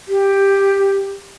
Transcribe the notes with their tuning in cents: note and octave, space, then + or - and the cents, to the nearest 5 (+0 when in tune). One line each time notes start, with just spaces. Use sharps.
G4 +10